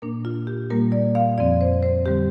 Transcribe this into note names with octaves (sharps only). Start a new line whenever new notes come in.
A#2 A#3 D4 A#4
F4
G4
A#2 G3 A#3 A#4
D5
F5
F2 F3 C4 D5
C5
C5
D3 G3 C4 G4